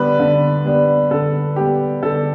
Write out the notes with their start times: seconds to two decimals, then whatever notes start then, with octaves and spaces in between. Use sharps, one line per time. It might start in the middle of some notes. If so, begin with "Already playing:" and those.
Already playing: D3 G3 B3 D4 B4 D5
0.20 D3
0.65 G3 B3 D4
1.11 D3 A4
1.56 G3 B3 D4 G4
2.02 D3 A4